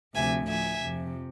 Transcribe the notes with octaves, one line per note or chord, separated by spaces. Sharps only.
D2 C3 F3 E5 G#5
A2 F3 E5 G#5
F2 C3 F3